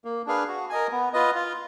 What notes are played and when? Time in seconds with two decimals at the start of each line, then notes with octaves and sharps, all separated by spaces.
0.05 A#3
0.26 D4 G#4 B4 F5
0.48 F#4
0.70 A#4 D#5 G#5
0.92 B3
1.13 F4 B4 D#5
1.35 F4